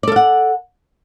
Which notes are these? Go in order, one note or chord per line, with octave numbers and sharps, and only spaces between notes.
A4 D5 F5 F#5